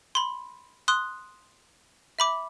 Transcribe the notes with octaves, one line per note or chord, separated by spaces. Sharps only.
B5 C6
C6 D#6 F#6
E5 B5 D6